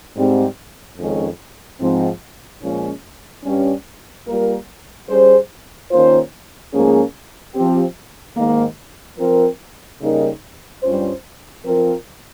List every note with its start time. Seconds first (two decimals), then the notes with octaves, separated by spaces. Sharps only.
0.16 G#2 G3 C4
0.98 F2 D#3 G#3 C#4
1.79 G#2 F3 C4
2.61 A#2 F3 G#3 C#4
3.44 G2 G3 C#4
4.26 G3 A#3 F4 A#4
5.08 G3 C#4 G#4 C5
5.90 D#3 A#3 C#4 F4 C5
6.72 G#2 F3 A#3 C#4 G#4
7.54 F3 C4 G4
8.36 G#2 D#3 A#3
9.18 F3 C4 F4 A#4
10.00 C#3 G3 A#3 D#4 A#4
10.82 G2 G3 C#4 F4 C5
11.64 F3 C4 F4 A#4